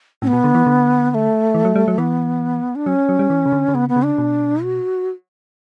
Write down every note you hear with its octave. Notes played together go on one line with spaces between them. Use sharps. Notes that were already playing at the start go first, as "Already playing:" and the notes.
A2 C#4
B3
B2
D3
E3
D3
B3
A3
E3
F#3
G3
F#3
E3 B3
D4
F#3 C#4
F#3
G3
E3
C#3
D3
D3
C#3 B3
B3
C#3
D4
B2
F#4